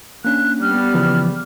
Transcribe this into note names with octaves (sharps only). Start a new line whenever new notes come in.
A#3 C#4 D4 F#6
G3 B3 F6
C#3 E3 F3